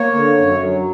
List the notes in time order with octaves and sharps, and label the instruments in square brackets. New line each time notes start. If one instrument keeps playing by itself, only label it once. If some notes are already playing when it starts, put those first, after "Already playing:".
Already playing: [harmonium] A#3 C#5
D3
F#2
F#3